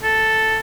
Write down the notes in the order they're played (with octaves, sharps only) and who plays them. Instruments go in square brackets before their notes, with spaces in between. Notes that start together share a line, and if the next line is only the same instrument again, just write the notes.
[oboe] A4